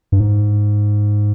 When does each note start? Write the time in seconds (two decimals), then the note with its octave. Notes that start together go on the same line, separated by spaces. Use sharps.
0.12 G2
0.20 G#2